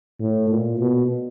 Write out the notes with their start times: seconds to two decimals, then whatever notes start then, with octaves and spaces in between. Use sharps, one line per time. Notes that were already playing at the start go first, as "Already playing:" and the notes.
0.21 A2
0.50 A#2
0.80 B2